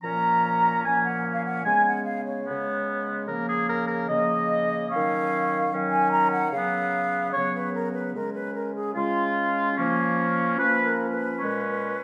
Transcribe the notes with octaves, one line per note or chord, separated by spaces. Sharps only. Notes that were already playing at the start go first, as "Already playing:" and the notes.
A#2 F3 A#3 C#4 A#5
A#2 F3 A#3 C#4 G#5
F#5
F5
F#5
C#3 G#3 B3 G#5
F#5
F5
C#5
C#3 G#3 B3
C#3 F3 A#3 A#4
G#4
A#4
A#4
C#3 F3 A#3 D#5
D#3 F#3 C#4 F5
D#3 F#3 C#4
G#5
A#5
F#5
C#3 F#3 B3 F5
C#3 F#3 B3 C#5
B4
A#4
B4
C#3 G#3 C#4 A#4
B4
A#4
G#4
C#3 G#3 C#4 F4
F3 A#3 C#4
F3 A#3 C#4 B4
A#4
B4
A#2 G#3 C#4